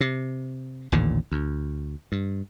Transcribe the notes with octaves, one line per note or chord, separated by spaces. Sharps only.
C3
A1 D#2 A#2 D3
D2
G2